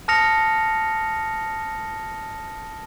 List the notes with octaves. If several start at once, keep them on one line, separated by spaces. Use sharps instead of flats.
A5 D#6 F6 A#6 C#7 F7